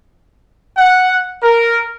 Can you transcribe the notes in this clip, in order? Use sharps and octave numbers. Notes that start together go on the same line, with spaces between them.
F#5
A#4